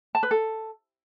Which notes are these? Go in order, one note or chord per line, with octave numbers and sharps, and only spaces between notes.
A5
B4
A4